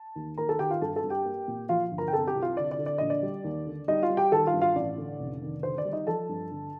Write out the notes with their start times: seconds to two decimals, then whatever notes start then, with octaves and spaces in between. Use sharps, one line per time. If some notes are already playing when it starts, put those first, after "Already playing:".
Already playing: A5
0.16 D#2
0.38 D#2 A#4 A#5
0.49 A4 A5
0.59 D#3 G4 G5
0.70 F4 F5
0.82 G2 A4 A5
0.96 A4 A5
1.04 G2
1.10 G4 G5
1.25 A#3
1.48 A#2
1.69 F3 F4 F5
1.91 G1
1.98 A#4 A#5
2.08 G5
2.13 C3 A4 A5
2.27 G4 G5
2.35 C2
2.42 F4 F5
2.57 D3 D5
2.71 D5
2.79 D3
2.86 D5
2.98 A#1 D#5
3.10 D5
3.23 G3
3.44 D#2
3.67 D3
3.88 G3 D#4 D#5
4.03 F4 F5
4.10 G3
4.17 G4 G5
4.32 D#3 A4 A5
4.47 F4 F5
4.54 G2
4.61 F4 F5
4.76 A1 D5
4.98 D3
5.20 F1
5.41 D#3
5.63 D3 C5
5.78 D5
5.85 G3
5.93 D#4 D#5
6.07 F3 A4 A5
6.29 G2
6.51 D3